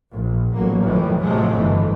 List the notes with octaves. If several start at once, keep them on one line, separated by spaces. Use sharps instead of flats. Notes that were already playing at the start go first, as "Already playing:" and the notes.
A#1
A1 F#3 A#3
F2 A2 D#3 E3 F#3
A2 C3 F3 F#3 G#3 A3
G1 F2 E3